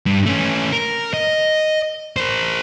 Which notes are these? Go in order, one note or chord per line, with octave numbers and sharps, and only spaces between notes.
G2
A3 C#4
A#4
D#5
A#4 C5